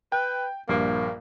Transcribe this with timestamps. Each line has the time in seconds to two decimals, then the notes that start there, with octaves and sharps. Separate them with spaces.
0.12 B4 G5
0.69 A#1 G2 A#3